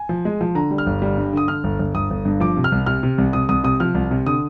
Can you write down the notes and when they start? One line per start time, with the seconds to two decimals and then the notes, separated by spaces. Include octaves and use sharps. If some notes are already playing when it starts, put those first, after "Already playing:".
Already playing: G#5
0.09 F3
0.25 G#3
0.41 F3
0.55 D3 A#5
0.71 G3
0.78 F6
0.86 G1
1.02 G3
1.17 G2
1.33 D3 D#6
1.48 D3 F6
1.64 G1
1.79 G1
1.95 G1 D#6
2.10 G1
2.25 G2
2.40 F3 D6
2.57 C3
2.64 F6
2.72 C2
2.86 C3 F6
3.03 C3
3.18 C2
3.33 C3 D#6
3.49 C2 D#6
3.64 C3 D#6
3.80 F3 F6
3.95 C2
4.11 C3
4.26 D3 D#6